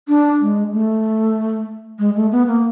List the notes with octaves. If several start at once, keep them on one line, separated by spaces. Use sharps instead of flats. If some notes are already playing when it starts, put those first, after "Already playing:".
D4
G#3
A3
G#3
A3
B3
A#3